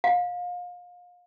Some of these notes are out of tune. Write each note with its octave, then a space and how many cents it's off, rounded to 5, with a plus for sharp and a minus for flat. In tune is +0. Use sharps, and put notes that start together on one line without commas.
F5 +30